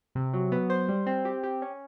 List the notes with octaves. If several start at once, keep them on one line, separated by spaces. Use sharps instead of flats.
C3
F#3
B3
C5
G3
C4
G4
G4
C#4